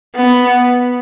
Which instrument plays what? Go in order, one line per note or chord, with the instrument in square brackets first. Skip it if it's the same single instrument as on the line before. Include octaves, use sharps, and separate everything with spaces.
[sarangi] B3